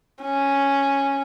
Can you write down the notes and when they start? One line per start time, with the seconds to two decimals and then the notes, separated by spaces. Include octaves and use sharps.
0.22 C#4